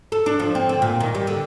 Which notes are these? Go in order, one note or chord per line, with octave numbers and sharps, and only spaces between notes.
A4
D4
F3
C4
D3
A#2
D#3
G3
D3